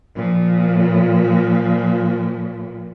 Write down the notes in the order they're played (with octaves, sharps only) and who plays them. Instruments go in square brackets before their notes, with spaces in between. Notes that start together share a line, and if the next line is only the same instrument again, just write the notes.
[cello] A#2 F3